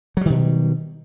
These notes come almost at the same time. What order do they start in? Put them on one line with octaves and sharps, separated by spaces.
F#3 G3 D#3 B2